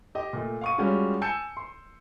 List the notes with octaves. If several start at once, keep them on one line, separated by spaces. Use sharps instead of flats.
G4 D#5
A#2 A3
F5 F#5 C#6 D#6 D#7
G3 G#3 C#4 F4 F#4
G#5 A5 E6 G6 C#7 E7
C6